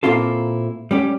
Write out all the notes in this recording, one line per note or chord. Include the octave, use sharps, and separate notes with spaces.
A#2 A#3 C4 E4 F4 A4
G3 C#4 G4